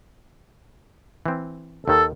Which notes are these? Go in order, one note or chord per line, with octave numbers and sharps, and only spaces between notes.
E3 C4
D#2 D#3 A4